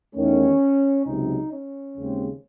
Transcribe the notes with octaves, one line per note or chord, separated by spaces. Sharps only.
E2 D#3 A3 C#4
C#2 C3 F#3 D#4
C#4
D#2 C#3 G#3 C4